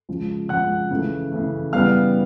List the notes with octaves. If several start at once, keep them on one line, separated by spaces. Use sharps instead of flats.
C#3 F3 G#3
C#3 F3 G#3 F#5 F#6
C#3 E3 A3
C#3 E3 A3
C#3 E3 G3 B3 F5 F6